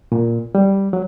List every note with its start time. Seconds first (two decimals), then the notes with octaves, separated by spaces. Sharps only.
0.12 A#2
0.55 G3
0.93 F#3